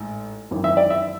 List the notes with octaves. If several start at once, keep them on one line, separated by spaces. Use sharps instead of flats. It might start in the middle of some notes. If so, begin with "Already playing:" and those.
Already playing: A1 G#2
G#1 F#2 E3
E5
D5
E5